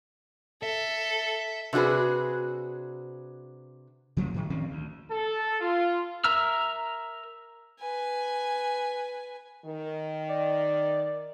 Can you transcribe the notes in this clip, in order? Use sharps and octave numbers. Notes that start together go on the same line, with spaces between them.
A4 E5
C3 D4 F#4 G#4 B4
C#3 F3 G3 A#3
A2 D#3
D#3 F3 C4 C#4
D2
A4
F4
A#4 E5 A#5 E6 F6
B4 G#5
D#3 A#4
D5